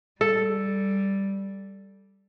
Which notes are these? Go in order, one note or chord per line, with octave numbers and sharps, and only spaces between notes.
G3 A4